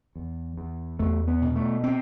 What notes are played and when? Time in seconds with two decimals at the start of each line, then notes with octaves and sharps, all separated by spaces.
0.16 E2
0.57 E2
0.99 E2 A3
1.28 B3
1.42 B2
1.56 A3
1.84 C4